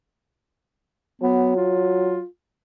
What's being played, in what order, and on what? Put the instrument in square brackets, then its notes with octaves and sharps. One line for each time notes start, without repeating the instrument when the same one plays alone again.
[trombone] F#3 [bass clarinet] B3
[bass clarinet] F4